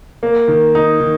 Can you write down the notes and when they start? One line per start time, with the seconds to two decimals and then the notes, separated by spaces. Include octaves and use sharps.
0.23 A#3
0.48 D#3
0.75 D#4
1.00 D#3